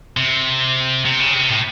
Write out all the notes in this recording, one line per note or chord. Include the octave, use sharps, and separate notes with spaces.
C3
C3
C#3
C3
A2